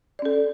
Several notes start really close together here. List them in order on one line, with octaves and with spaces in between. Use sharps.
D5 C#4 A4